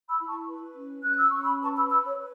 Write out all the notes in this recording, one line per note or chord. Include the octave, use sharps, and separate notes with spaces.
B5 E6
E4
A5 C#6
B4
C#4
C#4 F#6
E6
C#4 C#6
B5 E6
B4 A5 C#6
B5 E6
B4 B5 E6
C#5
B4